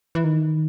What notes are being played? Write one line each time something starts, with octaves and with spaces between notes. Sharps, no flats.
E3
D#3